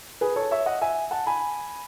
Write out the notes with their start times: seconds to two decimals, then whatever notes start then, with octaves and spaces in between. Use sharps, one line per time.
0.21 G#4 B4
0.36 A4 C#5
0.51 C#5 E5
0.66 D#5 F#5
0.81 E5 G#5
1.11 F#5 A5
1.26 G#5 B5